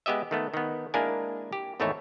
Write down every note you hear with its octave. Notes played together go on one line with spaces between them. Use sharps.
G#3 B3 G4 D#5 E5
D#3 A3 B3
D#3 B3
G#3 A#3 D4 E4 A#4 G#5
G4
G#1 E2 A3 D#4 E4 C#5